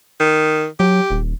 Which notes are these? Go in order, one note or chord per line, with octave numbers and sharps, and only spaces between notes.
D#3
F#3 G4
D#1